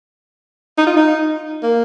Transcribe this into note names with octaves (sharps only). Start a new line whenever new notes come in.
D#4
F4
D#4
A#3